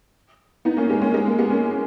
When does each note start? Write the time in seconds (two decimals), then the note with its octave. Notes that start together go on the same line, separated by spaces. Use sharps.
0.65 B3 D#4
0.77 A#3 C#4
0.90 G#3 B3
1.01 A#3 C#4
1.14 G#3 B3
1.27 A#3
1.38 G#3 B3
1.50 A#3 C#4